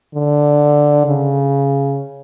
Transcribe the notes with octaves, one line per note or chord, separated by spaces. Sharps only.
D3
C#3